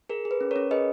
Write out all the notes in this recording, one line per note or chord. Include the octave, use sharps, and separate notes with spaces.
G#4 A#4
G#4
B4
C#4
A#4 C#5
C#4
G#4 B4 D#5